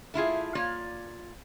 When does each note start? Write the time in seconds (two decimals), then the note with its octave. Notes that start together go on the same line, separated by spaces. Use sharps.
0.14 A3 E4 F4 G#4
0.55 A#3 F4 C#5 D5